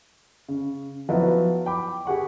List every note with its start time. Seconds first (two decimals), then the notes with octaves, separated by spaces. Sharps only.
0.48 C#3
1.09 F3 F#3 B3 E4
1.66 G5 B5 D6
2.06 G4 G#4 F#5 C#6